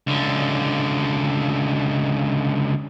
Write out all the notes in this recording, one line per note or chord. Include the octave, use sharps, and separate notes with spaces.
C#2 D3